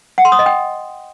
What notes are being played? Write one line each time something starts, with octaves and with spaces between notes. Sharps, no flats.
F#5
C6
D#6
D#5
G5